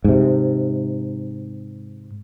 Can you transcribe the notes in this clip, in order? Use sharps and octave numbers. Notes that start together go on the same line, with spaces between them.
G#2 C3